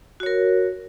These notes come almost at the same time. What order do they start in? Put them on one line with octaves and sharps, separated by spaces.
F#4 C#5 A#4